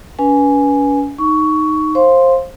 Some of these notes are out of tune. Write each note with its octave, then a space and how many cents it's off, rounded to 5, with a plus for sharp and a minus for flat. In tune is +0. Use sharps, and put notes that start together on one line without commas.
C#4 +40 B4 -25 G#5 +0
D#4 +0 C#6 +15
C5 +20 F5 +0 C6 +0